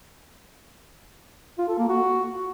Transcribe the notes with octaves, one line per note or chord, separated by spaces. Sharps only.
F4
A4
A#3
F#4